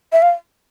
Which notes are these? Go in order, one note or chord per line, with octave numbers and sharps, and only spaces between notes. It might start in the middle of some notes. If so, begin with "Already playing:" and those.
E5
F5